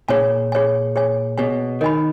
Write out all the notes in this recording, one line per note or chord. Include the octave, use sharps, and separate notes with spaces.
A#2 G#4 C#5 G#5
G#4 C#5 G#5
G#4 C#5 G#5
B2 G#4 C#5 G#5
D#3 A#4 D#5 G#5 B5